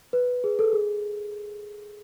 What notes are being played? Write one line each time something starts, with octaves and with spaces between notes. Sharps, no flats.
B4
G#4
A4
G#4